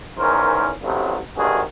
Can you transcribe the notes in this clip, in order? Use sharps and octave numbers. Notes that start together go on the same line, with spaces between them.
E2 G#2 D#3 C#4 A#4 C5
A1 G2 C3 F#3 A3
G#1 D2 G2 D#3 F#4 G#4